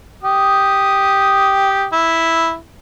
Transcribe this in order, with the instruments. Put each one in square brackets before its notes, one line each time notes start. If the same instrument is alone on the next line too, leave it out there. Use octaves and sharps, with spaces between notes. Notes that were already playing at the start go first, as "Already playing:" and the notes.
[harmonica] G4 D#6
E4